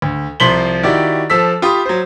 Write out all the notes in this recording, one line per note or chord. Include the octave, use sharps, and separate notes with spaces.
D2
C2 F3 C6 B6 F#7 G7
D#3 E4 F#4 G4 D5
F3 A4 E6 B6
F4 G4 B5 D#6
F#3 C5